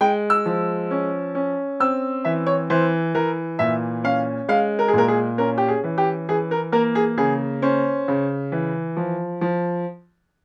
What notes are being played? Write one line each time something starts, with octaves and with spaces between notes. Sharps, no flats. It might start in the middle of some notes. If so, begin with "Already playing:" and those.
G#3 G5
E6
F3
C#4
C#4
C4 E6
E3 E5
C#5
E3 C5
E3 A#4
A#2 E5
C#4 F5
G#3 F5
A#4
G#4
A#2 A#4
G#4
C#4 A#4
G4
G#4
E3
G4
E3 G#4
A#4
A#3 A#4
G#4
C#3 G#4
C#4 C5
C#3
E3
F3
F3